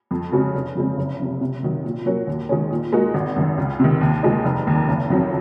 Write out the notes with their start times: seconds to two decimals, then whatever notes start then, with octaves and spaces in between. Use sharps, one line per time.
0.11 F2
0.32 C#3 G#3 C4 F#4
0.54 F1
0.75 F2 C#3 G#3 C4
0.97 F#1
1.20 F2 C3
1.41 C3
1.63 D#3 F#3
1.84 A#2
2.06 F#3 C#4 F#4 A#4
2.27 D#2
2.49 D#3 G#3 C#4
2.71 A#2
2.92 G#3 D#4 F#4 A#4
3.14 G#1
3.36 F#2 D#3
3.58 C#2
3.79 C3 D#3
4.01 D#2
4.23 D#3 G#3 D#4
4.45 F1
4.66 D#2 D#3
4.88 F#1
5.10 F2 D#3 F#3 C4